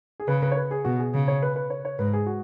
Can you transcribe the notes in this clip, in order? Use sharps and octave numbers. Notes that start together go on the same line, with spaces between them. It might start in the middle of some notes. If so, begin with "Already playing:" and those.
G#4
C#3 B4
B4
C#5
B4
G#4
B2 F#4
G#4
C#3
C#5
B4
B4
C#5
C#5
G#2 B4
G#4
F#4